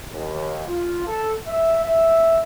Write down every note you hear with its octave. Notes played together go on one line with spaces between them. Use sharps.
D#2
F4
A4
E5
E5